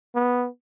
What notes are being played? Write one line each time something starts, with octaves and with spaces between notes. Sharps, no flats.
B3